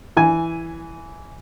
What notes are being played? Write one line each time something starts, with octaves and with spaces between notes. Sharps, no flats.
E3 G#5